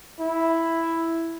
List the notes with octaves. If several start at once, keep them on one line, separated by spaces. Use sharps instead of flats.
E4